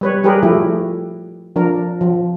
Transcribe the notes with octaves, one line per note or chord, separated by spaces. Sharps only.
G3 B4 C#5
G3 G4 G#4 A#4 B4
F3 A3 E4 G4
F3 D4 A#4
F3